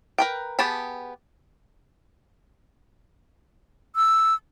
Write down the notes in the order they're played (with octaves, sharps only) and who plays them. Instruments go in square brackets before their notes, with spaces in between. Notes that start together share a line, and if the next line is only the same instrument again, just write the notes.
[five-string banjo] A#4 B4 G5
B3 G4 G#4 A5 B5
[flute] E6